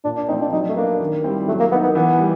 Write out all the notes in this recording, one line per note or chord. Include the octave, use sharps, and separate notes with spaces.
A#2 D4
D4
F3 A3 C4 D#4
D4
F#3 D#4
A3
A#3 B3 D4
D#3
G3 C4 E4
F#3 A3
A#3
A#3 B3 D#4
B3
E3 B3
G3